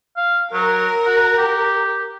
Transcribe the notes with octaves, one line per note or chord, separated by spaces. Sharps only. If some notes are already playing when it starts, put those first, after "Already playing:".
F5
F#3 A#4
F#4
G4